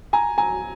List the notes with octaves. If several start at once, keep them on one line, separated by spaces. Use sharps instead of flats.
G#5 A#5
G#5 A#5